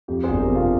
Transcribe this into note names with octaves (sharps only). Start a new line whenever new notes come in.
F2 G4
G#4 C5
G1
G4 A#4
C3
F4